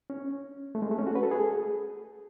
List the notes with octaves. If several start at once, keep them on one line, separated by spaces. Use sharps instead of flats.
C#4
A3
G#3
A3
C#4
F#4
B4
A4
G#4